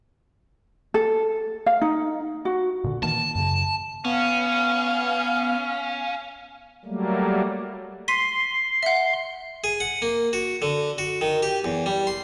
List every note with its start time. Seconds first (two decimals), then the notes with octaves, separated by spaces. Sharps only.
0.94 A4
1.66 F5
1.82 D#4
2.45 F#4
2.84 A#2 D3
3.03 D#3 E3 A#3 A5
3.35 F#2 C#3
4.05 B3 C#4 F5
6.85 F#3 G3 A3 A#3
8.08 C6 B6 D#7
8.83 E5 F#5
9.64 G#4
9.80 F#5
10.02 A#3
10.33 F#4
10.62 D3
10.98 F#4
11.21 D#3
11.43 G4
11.64 E2
11.86 G3
12.07 C6